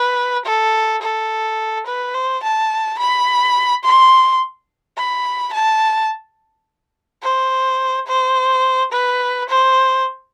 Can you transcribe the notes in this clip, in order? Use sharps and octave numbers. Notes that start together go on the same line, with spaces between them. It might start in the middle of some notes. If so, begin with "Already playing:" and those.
Already playing: B4
A4
A4
B4
C5
A5
B5
C6
B5
A5
C5
C5
B4
C5